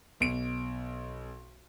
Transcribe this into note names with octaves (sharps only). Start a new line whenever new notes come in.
B1 D7